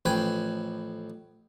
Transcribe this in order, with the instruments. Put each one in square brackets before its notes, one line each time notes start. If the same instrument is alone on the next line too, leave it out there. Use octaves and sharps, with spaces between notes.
[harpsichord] A1 F3 B4 G5 G#5